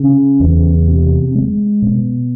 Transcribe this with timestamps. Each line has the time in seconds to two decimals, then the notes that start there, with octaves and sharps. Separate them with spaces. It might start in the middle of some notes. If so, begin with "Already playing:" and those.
Already playing: C#3
0.40 E2
0.87 C3
1.35 G#3
1.82 B2